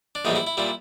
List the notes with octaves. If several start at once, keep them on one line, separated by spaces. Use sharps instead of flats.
D4
A#1 A2 E3 G3 D#4
E4
E4
A#2 G3 E4